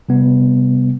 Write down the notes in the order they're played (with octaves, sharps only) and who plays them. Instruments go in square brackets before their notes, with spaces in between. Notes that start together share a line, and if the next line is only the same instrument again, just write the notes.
[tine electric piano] C3 G3 B3